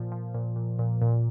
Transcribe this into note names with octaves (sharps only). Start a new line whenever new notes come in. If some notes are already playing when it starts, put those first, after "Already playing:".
Already playing: A#2 F3
F3
A#2
A#2
A#2
A#2